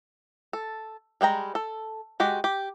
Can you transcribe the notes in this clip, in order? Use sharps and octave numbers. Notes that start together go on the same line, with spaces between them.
A4
G3 G#3 G5 A#5
A4
G#3 F#4 G4
G4